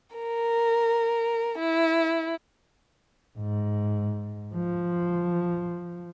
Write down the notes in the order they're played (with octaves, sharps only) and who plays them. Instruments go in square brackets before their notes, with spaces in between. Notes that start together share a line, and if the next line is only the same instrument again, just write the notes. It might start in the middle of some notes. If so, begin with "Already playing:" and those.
[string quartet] A#4
E4
[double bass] G#2
F3